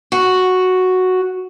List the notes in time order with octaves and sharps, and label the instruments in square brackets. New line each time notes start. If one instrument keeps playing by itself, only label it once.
[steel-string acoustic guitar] F#4